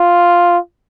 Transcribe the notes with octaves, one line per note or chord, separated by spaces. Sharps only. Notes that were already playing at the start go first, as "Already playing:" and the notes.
Already playing: F4